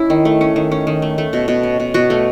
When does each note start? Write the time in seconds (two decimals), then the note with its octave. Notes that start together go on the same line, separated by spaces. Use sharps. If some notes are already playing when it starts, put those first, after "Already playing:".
Already playing: C#4 E4
0.10 D#3
0.25 A3
0.41 C#4
0.56 D#3
0.72 C#4
0.87 D#3
1.02 A3
1.18 A3
1.33 B2
1.48 B2
1.63 C#4
1.80 B2
1.94 B2 F#4
2.10 A3